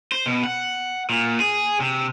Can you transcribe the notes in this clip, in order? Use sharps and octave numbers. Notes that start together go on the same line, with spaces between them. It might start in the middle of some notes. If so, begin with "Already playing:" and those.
C5
B2
F#5
A#2
G#4
C3